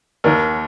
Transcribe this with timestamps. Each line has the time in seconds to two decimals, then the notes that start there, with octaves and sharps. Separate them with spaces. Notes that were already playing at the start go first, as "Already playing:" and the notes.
0.24 D#2 D#3 A#4